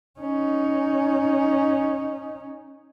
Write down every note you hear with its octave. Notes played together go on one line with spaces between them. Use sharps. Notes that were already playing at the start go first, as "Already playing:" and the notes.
C#4 D#4